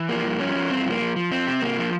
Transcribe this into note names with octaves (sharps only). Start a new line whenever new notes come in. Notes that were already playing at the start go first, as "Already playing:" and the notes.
Already playing: E3
F3 A#3
G2
F3 C#4
F3
G2 C4
F3 A#3
F3
F3
F2 C4
C3
C3 A#3
F3